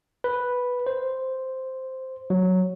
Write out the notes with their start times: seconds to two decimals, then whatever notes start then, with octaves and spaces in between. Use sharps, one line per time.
0.24 B4
0.87 C5
2.30 F#3